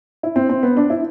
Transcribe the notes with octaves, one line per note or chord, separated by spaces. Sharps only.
E4
C4
C4
B3
D4
E4